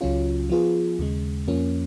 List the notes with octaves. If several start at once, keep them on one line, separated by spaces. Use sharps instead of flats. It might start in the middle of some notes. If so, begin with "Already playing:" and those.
C#2 C#3 F#3 C#4 F4
F3 B3 F4 G#4
D#2 C#3 G#3
F2 F3 A#3 C#4